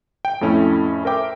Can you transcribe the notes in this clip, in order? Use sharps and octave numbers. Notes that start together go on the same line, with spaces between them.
G5
F2 A2 A3 C#4 E4
A#4 C5 E5 G5 D6